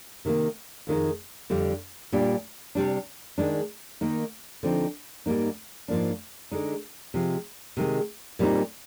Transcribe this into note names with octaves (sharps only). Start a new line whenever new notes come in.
C3 D#3 G3 A#3
F2 D#3 G#3 D#4
F2 D3 G3
A#2 G3 D4
C3 G3 D4
D#3 G#3 D4
D#3 A#3 D#4
D3 F3 C4 D#4
G#2 G3 A#3 D#4
G#2 F3 A#3 D4
D3 G#3 D#4
C3 F3 G#3
C3 D#3 G#3
A#2 G3 C4 D#4